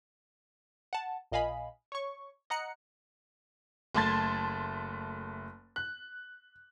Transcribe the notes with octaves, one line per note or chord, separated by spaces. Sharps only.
F#5 A5
A#1 A#2 D#5 F5 G#5 B5
C#5 C#6
D#5 F#5 A#5 F#6 C#7
F#1 A3 A5 C6 G#6 A6
F#6